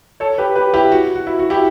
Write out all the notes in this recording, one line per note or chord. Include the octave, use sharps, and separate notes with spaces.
A4 C#5
G4 B4
G4 B4
E4 G4
F#4
F#4
E4
F#4
E4 G4